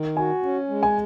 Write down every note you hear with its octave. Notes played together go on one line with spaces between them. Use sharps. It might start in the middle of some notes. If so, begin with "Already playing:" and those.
Already playing: D#3
F#4 G#5
C#4
G#3
G#5